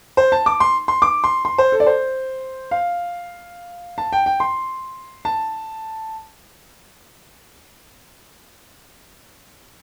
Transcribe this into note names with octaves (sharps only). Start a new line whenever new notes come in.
C5
A5
D6
C6
C6
D6
C6
C6
C5
A4
D5
C5
F5
A5
G5
G5
C6
A5